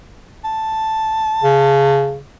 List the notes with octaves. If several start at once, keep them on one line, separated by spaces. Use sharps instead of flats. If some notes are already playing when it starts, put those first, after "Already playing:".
A5
C#3